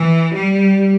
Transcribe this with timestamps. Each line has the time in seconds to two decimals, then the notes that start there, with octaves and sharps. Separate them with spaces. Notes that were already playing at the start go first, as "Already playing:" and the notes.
Already playing: E3
0.35 G3